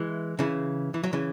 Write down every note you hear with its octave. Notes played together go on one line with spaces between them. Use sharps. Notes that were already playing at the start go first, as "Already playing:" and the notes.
Already playing: E3 G#3
C#3 E3
E3
F#3
C#3 E3